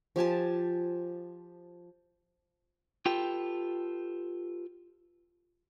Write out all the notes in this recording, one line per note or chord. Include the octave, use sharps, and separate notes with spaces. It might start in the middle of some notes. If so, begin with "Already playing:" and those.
F3 G4 G#5 A5
F4 G4 A4 B4 G5